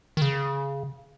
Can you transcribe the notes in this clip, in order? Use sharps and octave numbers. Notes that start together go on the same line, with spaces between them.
D#3
C#3